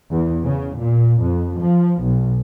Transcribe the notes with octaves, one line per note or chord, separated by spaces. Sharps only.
E2
C#3
A#2
F2
F3
B1